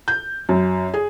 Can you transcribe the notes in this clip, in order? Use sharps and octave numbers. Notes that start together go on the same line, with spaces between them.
G6
F#2
G#4